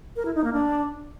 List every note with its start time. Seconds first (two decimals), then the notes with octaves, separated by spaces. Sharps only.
0.16 A#4
0.25 E4
0.35 D#4
0.44 A#3
0.53 D4